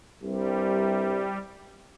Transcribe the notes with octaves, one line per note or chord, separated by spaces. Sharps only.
C2 G2 C3 G3